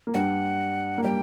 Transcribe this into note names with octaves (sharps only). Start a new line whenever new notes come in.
A#3
G2 G3 F#5
A#3
G3 G5